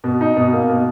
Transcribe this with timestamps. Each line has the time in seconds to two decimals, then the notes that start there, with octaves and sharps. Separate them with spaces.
0.04 B2
0.21 D#4
0.37 B2
0.53 A#3
0.69 B2